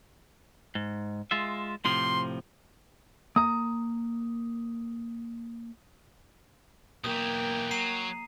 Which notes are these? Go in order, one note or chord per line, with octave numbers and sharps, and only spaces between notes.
G#2
G#3 F4 E5
A2 C3 F3 C6
A#3 A#5 D#6
B1 E3 A#3 G5 D#6
F#3 A#5 C7 D#7